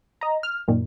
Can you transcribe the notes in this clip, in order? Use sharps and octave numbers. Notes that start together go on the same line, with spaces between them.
D#5 A#5
F6
F#2 A#2 D#3